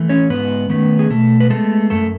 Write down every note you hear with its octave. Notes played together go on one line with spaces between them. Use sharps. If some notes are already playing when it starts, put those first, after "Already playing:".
Already playing: E3 A3
C#4 C#5
G#2 B3 B4
D#3 A3 B3 C#4 B4
G#4
B2 A3 A4
B4
G#3 A3 B3 A4
F#2 A3 A4